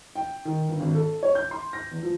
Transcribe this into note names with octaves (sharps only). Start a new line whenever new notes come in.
G5
D#3
G1
G#1
A4
C#5
G6
C6
A#6
E2
F3